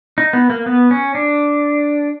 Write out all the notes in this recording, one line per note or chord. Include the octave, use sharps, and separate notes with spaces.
D#4
B3
A#3
B3
C#4
D4